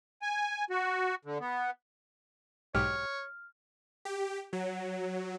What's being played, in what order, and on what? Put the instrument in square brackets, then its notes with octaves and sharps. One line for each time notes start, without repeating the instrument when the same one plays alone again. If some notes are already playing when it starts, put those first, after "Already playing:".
[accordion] G#5
F#4
D3
B3
[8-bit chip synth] B1 G#2 G4 [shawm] C#5 [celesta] F6
[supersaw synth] G4
F#3